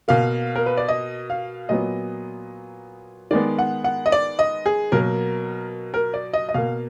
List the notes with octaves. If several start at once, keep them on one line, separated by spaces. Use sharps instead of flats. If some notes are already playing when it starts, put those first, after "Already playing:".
B2 A#3 F5
A#4
B4
D5
D#5
F5
A#2 F#3 B3 D#5
D#3 G#3 B3 D5
F#5
F#5
D#5
D5
D#5
G#4
B2 F#3 A#3 A#4
A#4
D5
D#5
D#5
B2 A#3 F5